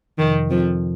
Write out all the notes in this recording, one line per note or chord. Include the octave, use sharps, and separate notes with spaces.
F2 C3 D#3 F3
F2 F3